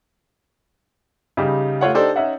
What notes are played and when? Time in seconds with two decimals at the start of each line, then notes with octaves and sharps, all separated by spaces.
1.37 C#3 G3 D#4 G4
1.81 A3 F4 C#5 F#5
1.94 D4 D#4 G4 A4 C5 D5
2.16 C#4 D#4 E5 F#5